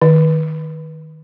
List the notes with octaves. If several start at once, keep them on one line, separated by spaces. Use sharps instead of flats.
D#3